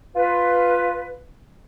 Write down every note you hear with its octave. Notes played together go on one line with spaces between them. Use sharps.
F4 B4